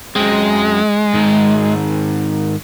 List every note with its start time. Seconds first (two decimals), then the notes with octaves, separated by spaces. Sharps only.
0.16 F#2 G#3 C4
1.14 G#2 D#3